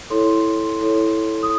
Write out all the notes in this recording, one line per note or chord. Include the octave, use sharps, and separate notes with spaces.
E4 A4 C#5 C6
E4 A4 C#5
D#6